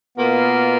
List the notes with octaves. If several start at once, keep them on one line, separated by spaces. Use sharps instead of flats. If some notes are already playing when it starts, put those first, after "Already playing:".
B2 A#3 B3 F4